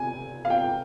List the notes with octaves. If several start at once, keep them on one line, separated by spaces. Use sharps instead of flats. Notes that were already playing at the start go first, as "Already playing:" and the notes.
Already playing: C3 G#5
F5
G5